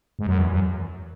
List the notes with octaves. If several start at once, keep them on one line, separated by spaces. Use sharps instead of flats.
G#2
F#2
E2
F#2